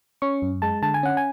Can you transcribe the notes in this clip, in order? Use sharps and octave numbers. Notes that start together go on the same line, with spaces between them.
C#4 C#6
F#2
G#3 A5
D3 A5
G#5
C#4 F#5
G#5